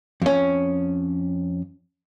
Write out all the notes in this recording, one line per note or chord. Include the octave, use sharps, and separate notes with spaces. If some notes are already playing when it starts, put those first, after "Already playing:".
F2 C#4